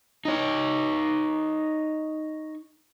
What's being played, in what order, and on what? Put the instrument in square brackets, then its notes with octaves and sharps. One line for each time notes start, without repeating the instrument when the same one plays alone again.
[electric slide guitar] D#4 C#5